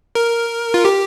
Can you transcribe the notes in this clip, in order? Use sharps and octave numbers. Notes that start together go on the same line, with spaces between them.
A#4
F4
G4